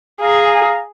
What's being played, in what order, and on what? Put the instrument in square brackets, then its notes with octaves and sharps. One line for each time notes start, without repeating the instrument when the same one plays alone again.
[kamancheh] G#4 [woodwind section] F5 A#5